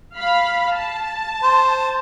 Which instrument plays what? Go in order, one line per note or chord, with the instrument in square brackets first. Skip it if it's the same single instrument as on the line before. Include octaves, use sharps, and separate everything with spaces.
[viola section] F5 B5
A5
[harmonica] C5